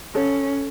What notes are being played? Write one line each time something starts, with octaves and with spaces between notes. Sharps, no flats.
C#4 A4 C#5